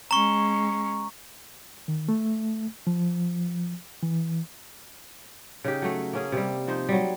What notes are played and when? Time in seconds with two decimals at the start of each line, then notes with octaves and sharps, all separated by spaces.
0.11 G#3 C#4 A#5 C#6
1.88 D#3
2.09 A3
2.87 F3
4.03 E3
5.64 C#3 D#4 G4
5.82 F#3 A3
6.13 A#3 C#4 G#4
6.32 C3 G3
6.67 F3 D#4 C5
6.89 F#3 G3